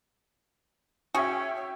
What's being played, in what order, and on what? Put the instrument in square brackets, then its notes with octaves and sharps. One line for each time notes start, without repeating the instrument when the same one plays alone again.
[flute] C#4 [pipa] F#4 G#4 [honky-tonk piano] E5 G5
[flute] C#5